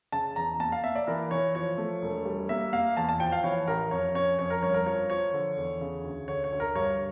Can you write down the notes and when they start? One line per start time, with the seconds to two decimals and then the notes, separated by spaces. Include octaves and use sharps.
0.12 C#3 A5
0.36 E2 A#5
0.59 A#3 A5
0.72 F5
0.84 A#3 E5
0.95 D5
1.07 E3 A#4
1.31 E3 C#5
1.55 F3 C#5
1.78 A3
2.02 E1
2.25 G3
2.49 A#3 E5
2.73 A#3 F5
2.97 E2 A5
3.09 A5
3.20 F3 G5
3.32 F5
3.44 E3 C#5
3.68 A1 A#4
3.91 F2 C#5
4.15 C#4 C#5
4.39 F2 C#5
4.50 A#4
4.62 G1 C#5
4.74 A#4
4.86 F3 C#5
5.10 F3 C#5
5.33 D3
5.57 E2
5.81 C#3
6.04 D2
6.28 D3 C#5
6.44 C#5
6.52 D2
6.60 A#4
6.75 G2 C#5